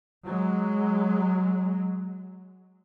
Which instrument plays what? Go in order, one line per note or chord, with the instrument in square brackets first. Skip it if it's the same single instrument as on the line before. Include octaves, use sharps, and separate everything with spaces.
[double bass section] F#3 G#3